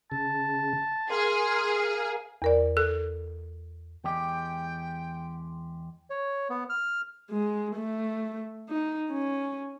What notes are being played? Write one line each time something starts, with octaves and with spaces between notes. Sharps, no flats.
C#3 A5
G#4 A#4 F5 C6
E2 A#4 D5
A4 F#6
E2 G#3 G4 G5
C#5
B3
F6
G#3
A3
D#4
C#4